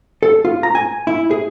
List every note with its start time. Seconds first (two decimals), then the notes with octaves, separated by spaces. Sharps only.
0.23 A4
0.45 F4
0.63 A#5
0.75 G#5
1.07 E4
1.31 G#4